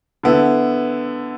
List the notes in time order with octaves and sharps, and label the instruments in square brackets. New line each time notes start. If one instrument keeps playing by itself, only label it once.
[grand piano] D3 B3 E4